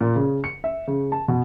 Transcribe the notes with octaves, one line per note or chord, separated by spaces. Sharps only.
A#2
C#3
C#7
E5
C#3
A5
B2